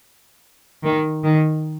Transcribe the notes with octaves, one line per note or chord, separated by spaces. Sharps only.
D#3
D#3